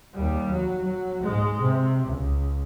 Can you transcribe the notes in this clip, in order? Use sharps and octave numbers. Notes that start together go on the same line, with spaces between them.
D#2 G3
F#3
F#3
G#2 G#3
C3
C#2